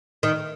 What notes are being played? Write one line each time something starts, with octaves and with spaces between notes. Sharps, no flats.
D#3